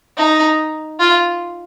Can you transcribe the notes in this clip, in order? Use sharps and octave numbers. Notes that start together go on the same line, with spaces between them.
D#4
F4